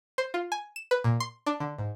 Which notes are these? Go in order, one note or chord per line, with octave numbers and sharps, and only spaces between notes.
C5
F4
G#5
E7
B4
A#2
C6
D4
D3
G#2